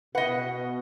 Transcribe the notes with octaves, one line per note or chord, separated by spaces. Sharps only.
B2 B4 D#5 F#5